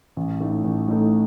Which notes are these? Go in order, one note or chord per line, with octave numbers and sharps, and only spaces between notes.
A1
A2 A3 D#4 A4
A1
A2 A3 D#4 A4